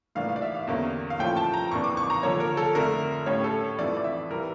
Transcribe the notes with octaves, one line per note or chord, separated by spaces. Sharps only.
A2 E3 A#3 D4 F5
F5
D5
E5
F5
E2 D3 G3 A#3 C#4
F5
A#2 F3 A3 C#4 E4 G5
A5
A#5
F2 E3 A#3 D4 C#6
D6
C#6
A#5
D3 F3 A#3 C#5
A#4
A4
F2 D3 A3 D4 A#4
A2 G3 C#4 C#5
A4
F2 E3 A3 D4 D5
D5
E5
E3 G3 A#4